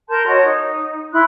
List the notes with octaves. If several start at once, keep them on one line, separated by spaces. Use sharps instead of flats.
A#4 A5 C6 G6
F#4 C#5 D#5
D#4
E4 C6 F#6